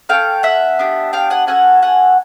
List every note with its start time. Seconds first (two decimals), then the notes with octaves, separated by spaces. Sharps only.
0.09 C#4 E4 A4 F5 G5
0.43 E5 F#5
0.79 B3 D4 G4
1.13 F5 G5
1.30 F#5 G#5
1.47 C#4 F#4 A4 F#5 G#5
1.82 F#5 G#5